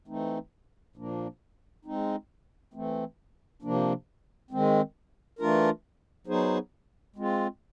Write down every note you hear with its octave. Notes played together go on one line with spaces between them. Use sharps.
E3 A3 C4 D#4
A#2 F3 A#3 D4
G#3 C4 D#4
E3 A3 C4
C3 F3 A#3 D4
D#3 G#3 C4
E3 A3 D4 F4 A#4
F#3 B3 D#4 G#4 C5
G#3 C4 F4